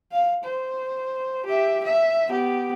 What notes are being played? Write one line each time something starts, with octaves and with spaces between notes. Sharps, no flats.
F5
C5
G4 E5
E5
B3 G4